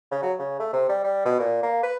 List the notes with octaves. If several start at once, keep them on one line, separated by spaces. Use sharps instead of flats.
C#3
F#3
C#3
A3
C3
G3
G3
B2
A#2
A#3
B4